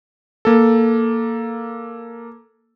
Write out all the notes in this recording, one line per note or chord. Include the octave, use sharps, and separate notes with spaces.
A#3 A4